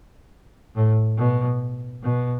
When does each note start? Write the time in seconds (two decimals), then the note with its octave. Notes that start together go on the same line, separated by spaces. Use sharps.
0.75 A2
1.17 B2
2.03 B2